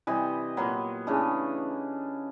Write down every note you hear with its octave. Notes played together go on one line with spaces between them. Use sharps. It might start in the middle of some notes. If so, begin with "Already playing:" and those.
C3 E3 G3 D#5
A#2 F#3 B3
C#3 E3 A3 D4 D#5